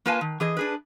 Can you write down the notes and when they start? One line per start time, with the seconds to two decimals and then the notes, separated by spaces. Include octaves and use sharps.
0.06 A#3 F4 B4 F5 G#5 A5
0.21 D#3
0.40 E3 G#4 D#5
0.57 D4 G#4 B4